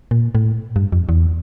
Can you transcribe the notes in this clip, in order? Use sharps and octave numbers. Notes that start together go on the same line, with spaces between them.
A#2
A2
G2
F2
E2